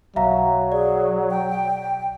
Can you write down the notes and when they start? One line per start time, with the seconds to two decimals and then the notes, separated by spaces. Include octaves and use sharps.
0.16 B1 F#3 E5 F5 A#5
0.72 G#4 D5
1.30 G5